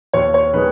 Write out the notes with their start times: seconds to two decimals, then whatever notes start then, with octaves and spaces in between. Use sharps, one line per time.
0.13 D#2 C#5
0.34 C#5
0.53 D#3 G#3 B4